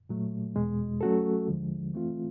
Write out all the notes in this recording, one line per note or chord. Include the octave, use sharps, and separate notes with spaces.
A#2 F#3 A3
E2 B2 G#3
F#3 A3 C#4 F#4 A4
D#2 D3 F3 G#3
E3 A3 C4 F4